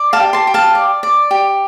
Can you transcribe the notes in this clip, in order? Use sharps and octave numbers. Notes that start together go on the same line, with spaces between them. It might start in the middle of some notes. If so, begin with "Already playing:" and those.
Already playing: D5
F5 A5
G4
A5 C6
G4
F5 A5
D5
D5
G4